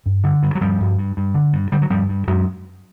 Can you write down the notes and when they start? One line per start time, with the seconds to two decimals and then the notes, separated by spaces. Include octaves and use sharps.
0.06 G2
0.24 D3
0.43 G2
0.55 F#3
0.61 G2 F3 G3
0.80 G2
0.98 G2
1.17 G2
1.34 D3
1.53 G2
1.72 D3 G3
1.82 F#3
1.90 G2 F3 G3
2.09 G2
2.27 F#2 F#3 G#3